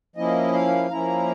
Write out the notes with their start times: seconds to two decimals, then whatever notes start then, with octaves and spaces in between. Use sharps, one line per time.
0.16 F3 A#3 C#4 E4 D#5
0.54 F5
0.91 F3 A#3 C#4 E4 A#5